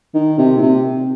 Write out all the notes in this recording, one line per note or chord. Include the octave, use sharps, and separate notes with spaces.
D#3
C3
A#2
C3